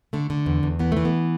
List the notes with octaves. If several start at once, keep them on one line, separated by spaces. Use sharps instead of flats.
D3 A3
D3
E2
E2
E3 B3
E3 A3
B3